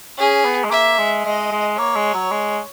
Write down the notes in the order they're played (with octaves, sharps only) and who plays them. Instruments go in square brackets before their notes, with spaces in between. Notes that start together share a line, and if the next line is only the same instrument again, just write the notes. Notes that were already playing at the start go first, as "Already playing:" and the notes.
[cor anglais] C#4 [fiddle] G#4
[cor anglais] B3
G#3
[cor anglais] A#3 [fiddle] E5
[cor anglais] G#3
[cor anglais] G#3 [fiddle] D#5
[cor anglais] G#3
[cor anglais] A#3 [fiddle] C#5
[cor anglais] G#3
F#3
G#3